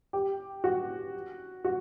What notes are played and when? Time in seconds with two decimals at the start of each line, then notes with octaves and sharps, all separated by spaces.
0.13 G4
0.64 F#4
1.65 F#4